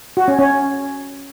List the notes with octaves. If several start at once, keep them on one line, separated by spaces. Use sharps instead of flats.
F#4
C#4
C#4